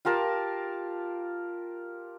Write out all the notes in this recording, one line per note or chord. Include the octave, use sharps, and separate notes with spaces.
F4 G4 A#4 A5